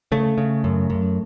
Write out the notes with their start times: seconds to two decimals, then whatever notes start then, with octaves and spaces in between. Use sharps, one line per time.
0.12 C#3 A3
0.38 C#3
0.64 F#2
0.90 F#2